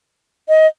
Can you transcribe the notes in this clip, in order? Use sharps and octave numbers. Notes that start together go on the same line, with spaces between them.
D#5